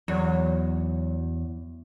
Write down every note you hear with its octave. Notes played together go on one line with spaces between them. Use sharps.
E2 F#3